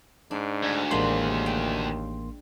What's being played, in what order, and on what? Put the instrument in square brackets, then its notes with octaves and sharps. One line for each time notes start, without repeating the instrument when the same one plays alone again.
[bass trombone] G#2 [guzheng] D4
[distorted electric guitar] D2
[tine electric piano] A1 A#3 C6 [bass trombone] D#2 [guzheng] G#3 C5 B5
[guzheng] G5